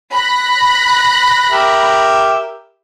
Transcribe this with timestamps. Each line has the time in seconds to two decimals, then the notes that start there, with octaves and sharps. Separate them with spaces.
0.13 B5 F#6 A#6
1.51 G4 A#4 E5